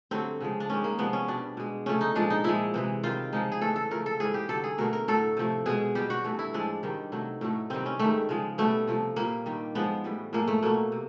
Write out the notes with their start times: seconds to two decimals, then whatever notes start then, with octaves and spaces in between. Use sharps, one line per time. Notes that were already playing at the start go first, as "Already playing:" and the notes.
0.11 G2 D3 F#3 A3 C4
0.41 C#3 F3 G#3
0.60 D4
0.69 G#2 D#3 G#3 C#4
0.84 A#3
0.98 C3 F3 G#3 B3
1.13 C#4
1.28 B2 G3 D4
1.57 B2 G#3
1.86 C#3 F3 A3 C#4
2.01 D#4
2.15 A#2 F3 G#3 D4
2.30 D#4
2.44 A#2 F3 G#3 E4
2.74 C3 E3 G#3
3.03 C3 D#3 G3 F4
3.32 C#3 F3 G#3 D#4
3.52 G#4
3.61 A2 E3 A3 A4
3.76 A4
3.91 C#3 F3 A3 A#4
4.06 A4
4.20 G#2 E3 G3 G#4
4.34 G4
4.49 G2 D3 F#3 A4
4.64 G#4
4.78 B2 F#3 A3 A#4
4.93 A#4
5.08 A2 F#3 A3 A4
5.37 C3 F3 A3
5.66 B2 G#3 G#4
5.95 B2 G3 G4
6.10 F#4
6.24 G2 E3 A3
6.39 E4
6.53 A2 F3 G#3 D4
6.83 G2 D#3 G3
7.12 C3 D#3 F#3 A3
7.41 A2 F#3 A3
7.70 C3 D#3 G3 C4
7.86 C#4
7.99 G#2 D#3 G3 A3
8.29 C#3 F3 G#3
8.58 B2 G3 A3
8.88 C3 F3 A3
9.16 A#2 G3 A#3
9.46 G2 D#3 G3
9.75 G#2 F3 G#3 B3
10.04 A2 E3 G3
10.33 A2 F3 G#3 A#3
10.48 A3
10.62 B2 F#3 A3 A#3
10.92 C3